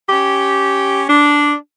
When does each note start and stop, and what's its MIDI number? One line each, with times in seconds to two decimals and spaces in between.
0.09 1.03 61
0.09 1.03 67
1.09 1.53 62